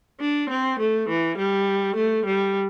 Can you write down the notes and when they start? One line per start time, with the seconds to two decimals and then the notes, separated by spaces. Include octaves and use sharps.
0.20 D4
0.50 C4
0.79 A3
1.09 E3
1.38 G3
1.96 A3
2.26 G3